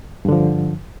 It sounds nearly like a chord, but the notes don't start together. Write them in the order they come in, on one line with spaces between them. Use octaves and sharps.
G2 D3 F3